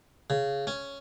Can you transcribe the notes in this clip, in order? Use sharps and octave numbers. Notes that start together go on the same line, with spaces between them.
C#3
C#4